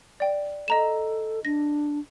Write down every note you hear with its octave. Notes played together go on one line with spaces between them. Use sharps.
D5 G5
A4 D#5 A#5 E7
D4 A#6